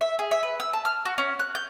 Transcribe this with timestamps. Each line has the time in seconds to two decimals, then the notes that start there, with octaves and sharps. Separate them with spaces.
0.01 E5
0.19 G#4
0.31 E5
0.43 B4
0.60 E6
0.73 A5
0.85 F6
1.05 F#4
1.18 C#4
1.39 F#6
1.55 G6